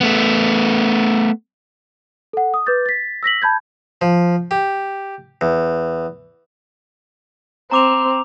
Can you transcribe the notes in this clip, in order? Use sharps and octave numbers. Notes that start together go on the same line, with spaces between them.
A3 B3
A4 F#5
D#6
B4 D6 G6 A6
A6 B6
E6 A#6 B6 F#7
A5 B5 G6 G#6
F3
G4
E2
C4 A#5 D6 F7